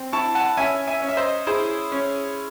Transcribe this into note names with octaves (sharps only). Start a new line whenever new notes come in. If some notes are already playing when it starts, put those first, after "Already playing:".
Already playing: C4
E4 A5 C#6
F#5 A5
C#4 E5 G#5
E5 G#5
C#4
E5
C5 D#5
E4 G#4 C5
C#4